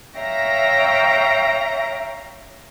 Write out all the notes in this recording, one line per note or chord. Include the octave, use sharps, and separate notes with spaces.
C#5 E5 F5 G5 A#5 A#6